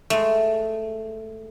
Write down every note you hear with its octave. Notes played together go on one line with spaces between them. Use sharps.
G#3 A3